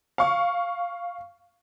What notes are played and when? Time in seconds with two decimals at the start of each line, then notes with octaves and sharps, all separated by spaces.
0.18 F5 C#6